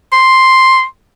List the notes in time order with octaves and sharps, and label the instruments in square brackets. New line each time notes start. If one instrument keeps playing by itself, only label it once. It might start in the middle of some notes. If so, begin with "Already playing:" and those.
[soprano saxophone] C6